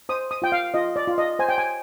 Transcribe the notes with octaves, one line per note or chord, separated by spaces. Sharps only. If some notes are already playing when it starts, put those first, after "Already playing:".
C5 D#6
D#6
F4 G5
F5
F4 D#5
D5
F4
D#5
C5 G#5
G5
G#5